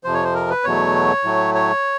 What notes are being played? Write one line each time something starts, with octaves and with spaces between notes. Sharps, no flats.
F2 C3 F3 C5
C#5
C5
A#4
B4
E2 B2 F#3 A3 C#5
A2 F#3 A3
C#5